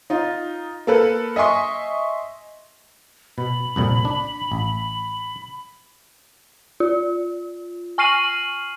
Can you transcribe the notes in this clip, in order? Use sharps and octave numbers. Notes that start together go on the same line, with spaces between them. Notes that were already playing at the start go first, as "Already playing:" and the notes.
D#4 F4
A#3 A4 B4
D#5 E5 G#5 C6 C#6
B2 B5
C2 F2 A#2
D4
A1
F4
G#5 C#6 F6 C7 D#7 F#7